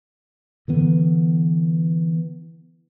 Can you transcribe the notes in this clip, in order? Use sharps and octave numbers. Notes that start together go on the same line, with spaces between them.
D3 E3 B3